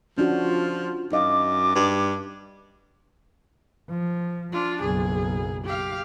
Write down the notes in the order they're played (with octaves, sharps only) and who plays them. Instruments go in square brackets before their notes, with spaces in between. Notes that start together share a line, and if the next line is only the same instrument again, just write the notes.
[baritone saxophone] F3 [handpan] C#4 D4 F#4
[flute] F4
[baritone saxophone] F#2 [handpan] D#4 D#5 F5 [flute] D6
[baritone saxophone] G2
[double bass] F3
[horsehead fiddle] D4 F4
[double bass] F#1 B1 [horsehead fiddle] G#4
[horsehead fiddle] G4 F5